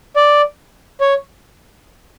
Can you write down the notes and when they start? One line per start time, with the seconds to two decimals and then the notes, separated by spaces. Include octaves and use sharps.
0.16 D5
1.01 C#5